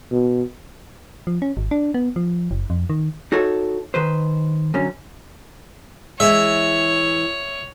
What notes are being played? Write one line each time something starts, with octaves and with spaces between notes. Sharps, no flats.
B2
F3
C#4
G#1
D4
B3
F3
F#1
F2
D#3
D#4 F#4 A4 C#5
D#3 B4 C5
F#2 D3 C#4
E3 G#3 C#5 E5